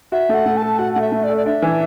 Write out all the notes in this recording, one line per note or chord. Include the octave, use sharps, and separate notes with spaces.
F#4 E5
A3 F#5
A3
A5
A4
F#4 F#5
A3 F#5
E5
A3
D5
A4
D5
D4 E5
E3